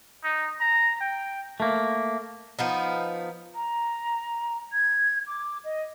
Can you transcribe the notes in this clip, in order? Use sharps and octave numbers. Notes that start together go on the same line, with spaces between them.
D#4
A#5
G5
A3 A#3
F3 B3 D#4
A#5
G#6
D6
D#5